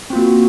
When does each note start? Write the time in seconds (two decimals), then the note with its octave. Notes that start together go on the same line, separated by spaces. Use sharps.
0.10 C4
0.13 F4
0.16 A#3
0.18 F#4